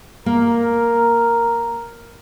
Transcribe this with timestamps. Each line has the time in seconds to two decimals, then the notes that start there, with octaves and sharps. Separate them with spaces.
0.26 A#3 A#4